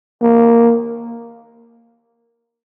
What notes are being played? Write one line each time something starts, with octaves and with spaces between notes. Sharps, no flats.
A#3